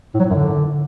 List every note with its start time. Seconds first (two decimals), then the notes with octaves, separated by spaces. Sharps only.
0.14 A2
0.19 F#3
0.25 A2
0.30 F#2
0.35 D3